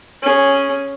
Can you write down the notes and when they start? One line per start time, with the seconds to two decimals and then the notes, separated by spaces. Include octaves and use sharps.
0.22 C#4 G#4